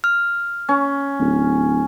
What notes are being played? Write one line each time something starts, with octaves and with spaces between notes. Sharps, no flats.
F6
C#4
D1